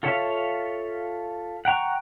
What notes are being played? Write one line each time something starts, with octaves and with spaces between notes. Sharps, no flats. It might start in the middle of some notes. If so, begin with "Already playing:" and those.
F4 A4 C#5 E5 F5
F#5 G5 A#5 C#6